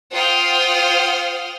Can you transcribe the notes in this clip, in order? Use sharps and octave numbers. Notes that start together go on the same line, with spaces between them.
F4 C5 F#5 G5 D#6 F6